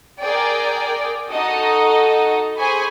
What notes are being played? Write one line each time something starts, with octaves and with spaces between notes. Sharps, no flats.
G#4 A#4 D5 G5
D#4 F#4 A4 D#5
G#4 C5 G#5 B5 C#6